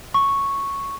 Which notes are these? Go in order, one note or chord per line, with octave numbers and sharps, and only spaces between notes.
C#6